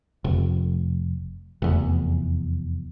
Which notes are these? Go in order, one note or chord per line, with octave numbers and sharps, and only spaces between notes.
F1
F1 E2